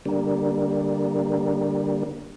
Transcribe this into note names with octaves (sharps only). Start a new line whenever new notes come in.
D3 G3 A#3